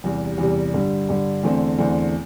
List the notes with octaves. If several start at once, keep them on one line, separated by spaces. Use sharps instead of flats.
E2 C3 G3
E2 C3 G3
G2 D3 G3
G2 D3 G3
E2 D3 A3 C4
E2 D3 A3 C4